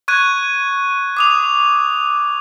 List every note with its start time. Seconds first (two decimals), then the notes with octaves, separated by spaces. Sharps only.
0.08 C#6 F#6 G#6 D#7
1.17 D6 D#6 F7